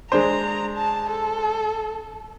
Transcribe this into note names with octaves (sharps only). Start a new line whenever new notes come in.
G#3 D4 C5 A#5
A5
A4